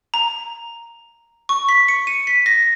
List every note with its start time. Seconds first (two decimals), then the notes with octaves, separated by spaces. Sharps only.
0.14 A#5
1.49 C#6
1.69 B6
1.88 C#7
2.07 D#7
2.27 B6
2.46 A#6